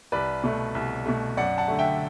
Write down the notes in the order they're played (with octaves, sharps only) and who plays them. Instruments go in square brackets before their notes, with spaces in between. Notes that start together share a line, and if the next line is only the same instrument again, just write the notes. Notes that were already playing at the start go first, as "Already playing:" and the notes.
[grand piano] C2 B4 D5
B2 A3
C2
B2 A3
F#2 D5 F#5
F#5 A5
D3 A3
E5 G5